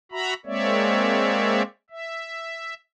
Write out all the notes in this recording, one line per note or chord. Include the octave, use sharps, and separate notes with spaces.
F#4 E5 A#5 B5
G#3 A#3 C4 C#5 D5 E5
E5